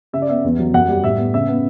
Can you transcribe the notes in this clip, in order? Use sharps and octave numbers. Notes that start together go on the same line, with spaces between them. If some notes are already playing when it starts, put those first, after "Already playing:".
C#3 E5
D5
B3 E5
E2
F#3
F#2 F#5
G3
A2 E5
B3
C#3 E5
B3